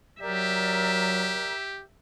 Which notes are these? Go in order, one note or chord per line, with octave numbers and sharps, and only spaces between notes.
F#3 G4 A#4 D5 E5 A#5